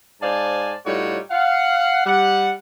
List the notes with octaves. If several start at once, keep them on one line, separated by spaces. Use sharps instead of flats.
G#2 C5 D5 F5 G#5 A5
A2 G3 D#4 F4 F#4 C#5
F5 F#5
G3 F#5